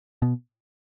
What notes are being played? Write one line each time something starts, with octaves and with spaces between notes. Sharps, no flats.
B2